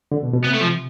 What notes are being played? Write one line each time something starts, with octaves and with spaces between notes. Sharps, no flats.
D3
B2
B2
C3 B3
A3
F3